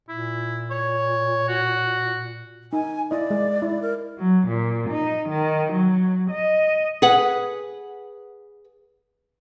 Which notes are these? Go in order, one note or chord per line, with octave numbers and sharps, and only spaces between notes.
A#2 E4
C#5
F#4
D#4 G#5
E4 D5 D#5
G#3
E4
A#4
F#3
A#2
D#4
D#3
F#3
D#5
G#4 B4 F#5